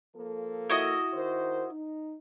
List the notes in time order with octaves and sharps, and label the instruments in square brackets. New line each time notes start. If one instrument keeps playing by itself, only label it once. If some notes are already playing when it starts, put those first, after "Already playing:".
[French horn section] F3 A#3 A4
[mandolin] E4 F#4 D#5
[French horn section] D#3 A#4 C5
D#4